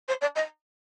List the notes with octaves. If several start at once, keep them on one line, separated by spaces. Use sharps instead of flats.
C5
D5
D#5